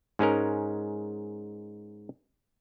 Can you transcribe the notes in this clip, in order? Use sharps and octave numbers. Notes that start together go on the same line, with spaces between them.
G#2 G#3 C#4 A#4